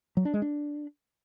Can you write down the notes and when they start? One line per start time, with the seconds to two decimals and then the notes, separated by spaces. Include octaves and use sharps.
0.17 F#3
0.25 D4
0.34 G#3
0.42 D4